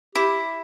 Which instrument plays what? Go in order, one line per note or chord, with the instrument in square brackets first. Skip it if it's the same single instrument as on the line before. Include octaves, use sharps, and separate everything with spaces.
[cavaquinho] E4 [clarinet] G4